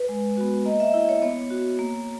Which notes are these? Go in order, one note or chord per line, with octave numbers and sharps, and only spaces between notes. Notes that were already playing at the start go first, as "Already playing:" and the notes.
Already playing: B4
G#3
B3 F#4
A#3 D#5
E5
E4
C#5
B3 C#5
F#4
A#3